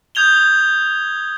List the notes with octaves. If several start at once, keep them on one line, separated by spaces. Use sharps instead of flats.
D#6 G6 G#6 F7 G7